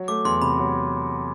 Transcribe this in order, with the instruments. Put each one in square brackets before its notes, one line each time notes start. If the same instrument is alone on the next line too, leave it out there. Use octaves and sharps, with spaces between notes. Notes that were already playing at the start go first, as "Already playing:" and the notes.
Already playing: [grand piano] F#3
[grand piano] A3 [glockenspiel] D6
[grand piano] E2 [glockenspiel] C6
[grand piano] C3 [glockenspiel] B5
[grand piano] F#3